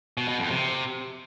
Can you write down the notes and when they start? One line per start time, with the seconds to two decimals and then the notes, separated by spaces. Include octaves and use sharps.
0.17 B2
0.28 B2
0.39 F2
0.50 C3